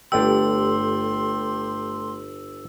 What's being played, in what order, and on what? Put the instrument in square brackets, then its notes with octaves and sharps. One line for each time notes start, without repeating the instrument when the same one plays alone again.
[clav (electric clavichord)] G1 D5 G5 [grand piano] A3 G4 [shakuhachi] C6 [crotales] E6